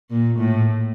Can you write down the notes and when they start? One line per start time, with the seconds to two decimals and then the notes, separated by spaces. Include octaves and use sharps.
0.10 A#2
0.38 A2